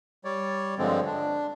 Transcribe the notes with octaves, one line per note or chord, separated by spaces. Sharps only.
G3 C#5 D5
G2 D3 F3 G#3 C4
D4